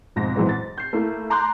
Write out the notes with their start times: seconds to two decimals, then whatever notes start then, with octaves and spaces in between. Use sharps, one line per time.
0.16 B1 F2 G#2 A#6
0.36 F2 G#2 E3 F#3 G#3 B3
0.49 A6
0.78 G6 C7
0.93 A3 A#3 E4
1.30 A5 A#5 C6 D6 F#6 G6